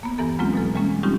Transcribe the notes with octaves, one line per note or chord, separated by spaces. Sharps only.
A#3 B3
E2 G2 E3 B3 A4 A#5
F#3 G#3 A#3 C4 C#4 F4
B2 F#3 A4
E3 G3 G#3 A#3 C#4
G3 C4 C#4 D#4 F4 G4